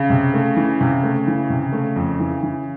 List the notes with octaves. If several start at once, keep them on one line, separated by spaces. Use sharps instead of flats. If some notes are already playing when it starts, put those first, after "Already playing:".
Already playing: C#3
C3
A3
E3
C3
A3
E3
C3
A3
F2
E3
E3